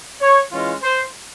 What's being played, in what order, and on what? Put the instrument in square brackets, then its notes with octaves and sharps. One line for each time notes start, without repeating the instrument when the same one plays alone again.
[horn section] C#5
E3 G#3 C#4 F4
C5